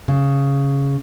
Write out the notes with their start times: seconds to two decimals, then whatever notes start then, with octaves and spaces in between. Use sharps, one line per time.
0.08 C#3